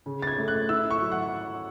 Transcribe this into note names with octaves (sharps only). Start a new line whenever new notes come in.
C#3
A6
G#6
A3
F#6
E4 E6
C#6
F#3
F#5